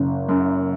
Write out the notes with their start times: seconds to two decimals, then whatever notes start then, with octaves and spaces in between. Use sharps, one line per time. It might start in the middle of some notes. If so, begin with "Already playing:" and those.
Already playing: F#1
0.29 F#2